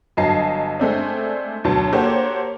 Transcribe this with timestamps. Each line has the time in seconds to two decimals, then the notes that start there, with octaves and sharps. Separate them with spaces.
0.17 G1 F#3 D#5 G#5 A5 C7
0.80 G#3 A3 C4 D4
1.64 D2 B2 F#3 C#5 A5
1.92 A#3 F#4 G4 A4 C5 C#5